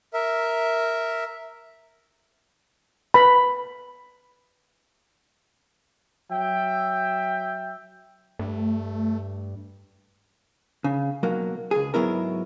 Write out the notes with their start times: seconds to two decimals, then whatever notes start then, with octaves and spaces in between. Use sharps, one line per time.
0.14 A#4 E5
3.14 B4 B5
6.31 F#3 E5 G5
8.39 G2 A3
10.84 C#3
11.23 B1 F#3 A#3
11.71 C#2 G#4
11.94 G#2 F#3 B3 E4 A#4